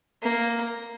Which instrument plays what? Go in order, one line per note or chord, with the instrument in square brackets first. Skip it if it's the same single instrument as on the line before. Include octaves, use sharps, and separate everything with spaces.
[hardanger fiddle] A#3